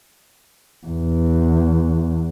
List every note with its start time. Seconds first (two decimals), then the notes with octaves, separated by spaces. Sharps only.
0.87 E2